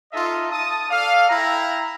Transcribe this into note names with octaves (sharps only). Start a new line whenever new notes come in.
D#4 F4 A4 D#5 E5
A5 D#6
A4 D5 F5
E4 G5 A#5